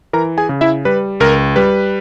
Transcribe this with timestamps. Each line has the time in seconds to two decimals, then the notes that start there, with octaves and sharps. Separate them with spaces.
0.13 E3 A#4 A#5
0.38 G#4 G#5
0.49 C#3
0.61 E4 E5
0.85 G3 B4
1.20 C#2 A#4
1.56 G3 B4